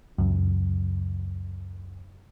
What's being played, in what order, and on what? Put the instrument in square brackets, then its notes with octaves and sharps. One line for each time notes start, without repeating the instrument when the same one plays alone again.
[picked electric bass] C#2 F#2